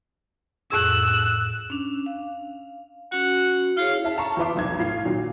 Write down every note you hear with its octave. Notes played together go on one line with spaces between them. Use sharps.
F2 A2 G#4 E6 F#6
C#4 D4
F5
C#4 F#4 F#5
E4 G#4 C#5 F5
E5 A5
A5 A#5 C#6
E2 F4 B4 E5 C6 D6
F1 B1 G#6
A2 F4 C7
A#2 D#3 F#3